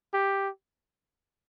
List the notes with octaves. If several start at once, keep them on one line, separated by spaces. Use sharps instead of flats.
G4